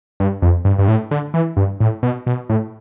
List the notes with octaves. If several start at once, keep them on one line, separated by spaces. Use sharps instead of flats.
G2
F2
G2
G2
A2
D3
E3
G2
A2
B2
B2
A2